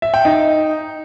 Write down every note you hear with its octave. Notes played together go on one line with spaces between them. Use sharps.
E5
G5
D#4